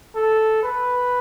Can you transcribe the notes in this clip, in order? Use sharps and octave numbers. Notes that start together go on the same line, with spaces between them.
A4
B4